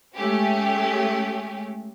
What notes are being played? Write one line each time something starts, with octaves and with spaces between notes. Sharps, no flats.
G#3 A3 C#4 G4